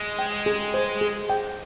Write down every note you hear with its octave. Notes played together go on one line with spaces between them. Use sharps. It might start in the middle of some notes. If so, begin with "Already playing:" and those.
Already playing: G#3
G5
G#4
C5
G#4
G5